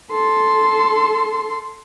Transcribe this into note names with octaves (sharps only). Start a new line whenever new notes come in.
A4 C6